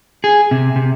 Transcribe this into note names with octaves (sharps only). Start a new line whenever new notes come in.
G#4
C3
C3